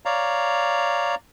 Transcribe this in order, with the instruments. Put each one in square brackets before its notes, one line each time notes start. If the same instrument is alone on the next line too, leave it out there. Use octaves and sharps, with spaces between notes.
[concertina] C#5 D5 F5 A#5